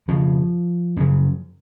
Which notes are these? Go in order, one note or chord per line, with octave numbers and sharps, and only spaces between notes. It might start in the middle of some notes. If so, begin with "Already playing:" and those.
F2 C#3 F3
F#2 C#3